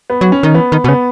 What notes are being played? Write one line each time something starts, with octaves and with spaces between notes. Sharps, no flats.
B3
F#3
C#4
D#3
E3 B3
D#3
B2
C#3 B3